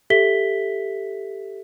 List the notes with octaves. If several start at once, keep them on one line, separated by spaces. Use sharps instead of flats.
G4 A4 E5 B6 G7